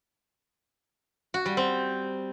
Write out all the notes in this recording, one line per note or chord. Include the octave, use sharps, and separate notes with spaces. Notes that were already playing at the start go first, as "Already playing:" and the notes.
F#4
G3
C4